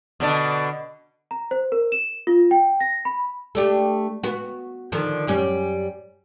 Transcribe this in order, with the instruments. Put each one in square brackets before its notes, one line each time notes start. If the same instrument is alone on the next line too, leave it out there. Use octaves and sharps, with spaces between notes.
[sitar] B2 D3 D4
[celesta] A#5
C5
A#4
E7
F4
G5
A#6
B5
[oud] A3 D4 G4
B3 F#4
D3 D#3 F3
F#2 G3 C#4